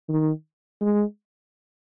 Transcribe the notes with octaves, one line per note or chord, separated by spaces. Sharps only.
D#3
G#3